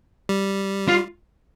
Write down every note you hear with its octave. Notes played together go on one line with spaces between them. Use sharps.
G3
F4